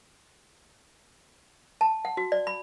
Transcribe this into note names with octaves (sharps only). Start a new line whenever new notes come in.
A5
F#5
F#4
D5
B5